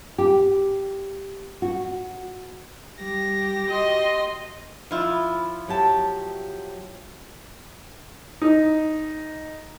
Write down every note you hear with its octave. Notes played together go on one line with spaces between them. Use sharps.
G4
F#4
G3 G4 A#6
F#4 D#5 C6
F3 E4 F4
F#3 G4 A5
D#4